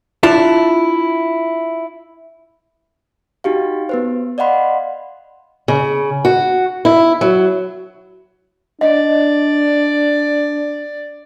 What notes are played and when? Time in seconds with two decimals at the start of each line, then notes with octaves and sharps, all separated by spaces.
0.23 D4 E4 F4 A5
3.44 D#4 F#4 G4 F5
3.89 B3 B4 C5
4.38 D5 D#5 F5 F#5 B5 C6
5.68 C#3
6.25 F#4
6.85 E4
7.21 F#3
8.81 D4 D5 D#5